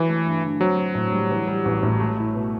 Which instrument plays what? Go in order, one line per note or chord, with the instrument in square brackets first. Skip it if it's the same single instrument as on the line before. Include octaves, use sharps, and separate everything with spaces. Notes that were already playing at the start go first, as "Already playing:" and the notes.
Already playing: [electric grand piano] E3 [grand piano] F#3
[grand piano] A3
G2
D3
[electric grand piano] F#3 [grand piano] C4
[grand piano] F#4
A2
G3
E3
G3
A1
A2
A3
E4
B2